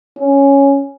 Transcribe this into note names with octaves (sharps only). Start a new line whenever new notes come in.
C#4